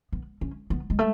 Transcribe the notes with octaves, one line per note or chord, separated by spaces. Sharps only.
B3
C#4
B3
G#3
A3